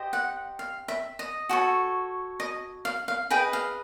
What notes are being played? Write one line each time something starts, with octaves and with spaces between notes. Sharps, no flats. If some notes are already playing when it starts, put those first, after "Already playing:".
Already playing: G4 C5 D#5
F#5
F5
E5
D#5
F#4 A4 C#5
D#5
F5
F5
G#4 B4 D#5 G5
F5